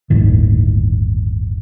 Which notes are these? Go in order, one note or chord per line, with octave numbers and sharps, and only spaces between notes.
G1 D#2 A2 D#3